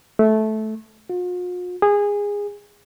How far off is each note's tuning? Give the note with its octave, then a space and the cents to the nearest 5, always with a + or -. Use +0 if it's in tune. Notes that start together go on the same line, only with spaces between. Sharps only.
A3 -15
F4 +45
G#4 -20